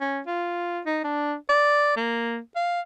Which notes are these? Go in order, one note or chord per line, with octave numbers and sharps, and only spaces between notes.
C#4
F4
D#4
D4
D5
A#3
F5